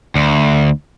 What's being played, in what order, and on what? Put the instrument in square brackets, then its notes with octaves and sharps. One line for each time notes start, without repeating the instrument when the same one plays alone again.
[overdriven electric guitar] D2